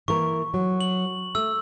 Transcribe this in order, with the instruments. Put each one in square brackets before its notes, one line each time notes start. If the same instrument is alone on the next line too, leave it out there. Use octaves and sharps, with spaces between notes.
[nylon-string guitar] E3 A#3 A#4 [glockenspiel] C#6
[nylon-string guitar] F#3
[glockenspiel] F#7
[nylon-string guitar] A3 [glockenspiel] E6